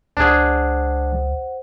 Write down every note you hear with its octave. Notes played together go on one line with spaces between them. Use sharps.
C#2 D4 G#4 C5 F#5